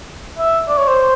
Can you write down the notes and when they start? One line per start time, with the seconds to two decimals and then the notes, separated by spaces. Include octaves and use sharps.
0.38 E5
0.68 D5
0.78 C#5
0.88 C5